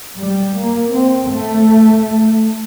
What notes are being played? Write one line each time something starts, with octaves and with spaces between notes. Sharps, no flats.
G3
A#3
C4
A3